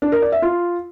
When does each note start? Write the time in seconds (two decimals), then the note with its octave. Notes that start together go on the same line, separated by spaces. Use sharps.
0.02 D4
0.12 A#4
0.22 D5
0.32 E5
0.42 F4